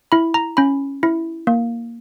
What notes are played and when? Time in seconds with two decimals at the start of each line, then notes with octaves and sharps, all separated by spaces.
0.12 E4 B5
0.34 A#5
0.57 C#4 B5
1.03 E4
1.47 A#3